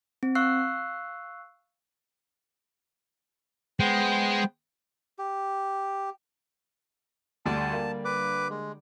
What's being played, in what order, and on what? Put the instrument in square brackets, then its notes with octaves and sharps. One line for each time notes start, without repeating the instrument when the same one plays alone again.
[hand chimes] C4
F5 C#6 E6 F#6 C7
[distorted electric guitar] G#3 [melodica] B3 C5 G5
[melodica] G4
[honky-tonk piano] D2 [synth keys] D3 G3 D5 [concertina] A5
[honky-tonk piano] A#3
[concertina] B4 D6
G#3